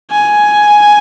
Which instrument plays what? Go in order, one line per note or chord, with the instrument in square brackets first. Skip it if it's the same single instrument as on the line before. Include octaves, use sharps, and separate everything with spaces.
[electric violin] G#5